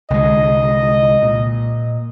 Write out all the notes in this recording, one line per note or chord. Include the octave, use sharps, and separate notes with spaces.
C2 D3 G#3 D#5
A#2